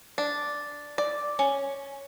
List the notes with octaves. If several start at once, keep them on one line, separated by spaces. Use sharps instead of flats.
D4
D5
C#4